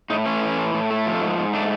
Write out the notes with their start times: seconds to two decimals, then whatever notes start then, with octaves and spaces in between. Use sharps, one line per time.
0.10 A2 D#4
0.26 A3 C#4
0.42 E3
0.57 A2
0.74 A2
0.90 A3
1.06 F3
1.21 G#2
1.38 G#2
1.53 A3 D4